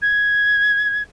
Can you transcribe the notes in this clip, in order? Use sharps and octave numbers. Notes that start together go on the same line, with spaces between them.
G#6